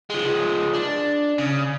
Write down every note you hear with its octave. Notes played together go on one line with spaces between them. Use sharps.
F3 G#3
D4
C#3